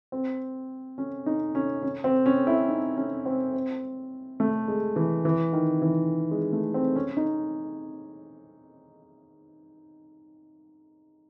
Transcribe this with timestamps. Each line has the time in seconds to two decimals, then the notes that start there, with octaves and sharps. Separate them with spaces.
0.12 C4
0.98 C#4
1.26 D#4
1.55 C#4
1.83 C#4
2.04 C4
2.26 C#4
2.47 E4
2.69 D#4
2.97 C#4
3.26 C4
3.54 C4
4.40 A3
4.68 G#3
4.96 E3
5.25 E3
5.53 D#3
5.82 E3
6.31 G#3
6.53 A3
6.74 C4
6.96 C#4
7.17 D#4